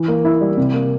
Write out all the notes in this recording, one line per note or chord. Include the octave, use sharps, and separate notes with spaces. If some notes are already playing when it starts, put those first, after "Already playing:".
Already playing: E3
A#3
E4
G3
C3
A#3